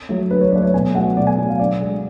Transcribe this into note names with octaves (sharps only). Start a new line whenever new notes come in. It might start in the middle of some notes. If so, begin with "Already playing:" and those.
F#3 A3
D3 B4
C#5
F#3 A3 D5
C#5
B2 G#5
F#3 A3 F#5
B2 D5
G#5
F#3 A3
F5
D3 D5
G#3